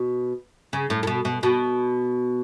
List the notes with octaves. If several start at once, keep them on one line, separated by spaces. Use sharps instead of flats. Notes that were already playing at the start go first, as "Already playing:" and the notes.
Already playing: B2
C#3
A2
A2
B2
B2
B2